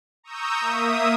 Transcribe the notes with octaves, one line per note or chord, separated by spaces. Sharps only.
A#5 C#6 D#6 E6 G6
A#3 E5 D#6